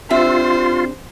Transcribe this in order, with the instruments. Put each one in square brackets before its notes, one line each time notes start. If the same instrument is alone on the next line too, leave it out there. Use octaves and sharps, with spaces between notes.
[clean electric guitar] C4 D4 G4 [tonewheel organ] F4 [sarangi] C5 [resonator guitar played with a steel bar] E5